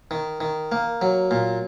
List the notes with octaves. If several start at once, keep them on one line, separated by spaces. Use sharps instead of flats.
D#3
D#3
A#3
F#3
A#2